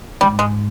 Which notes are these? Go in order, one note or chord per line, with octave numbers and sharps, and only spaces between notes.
G#2 G3
G#3